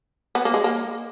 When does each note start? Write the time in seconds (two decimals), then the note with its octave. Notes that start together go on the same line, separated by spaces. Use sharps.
0.35 B3
0.45 A#3
0.54 G#3
0.64 A#3